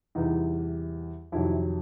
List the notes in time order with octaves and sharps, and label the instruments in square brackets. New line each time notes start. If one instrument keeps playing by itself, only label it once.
[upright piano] E2 C3 E3 G3 D#4
F2 C3 D#3 F#3 E4